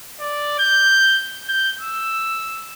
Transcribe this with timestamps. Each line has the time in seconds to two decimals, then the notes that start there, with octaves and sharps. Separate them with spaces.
0.20 D5
0.59 G6
1.48 G6
1.81 E6